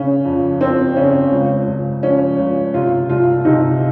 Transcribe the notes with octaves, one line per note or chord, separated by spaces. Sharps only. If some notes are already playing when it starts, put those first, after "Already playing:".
Already playing: C#3 C#4
F2
F2 C4
C#3 C#4
C#2
C#2
F3 C#4
C#2
C3 F4
C2 F4
C3 D#4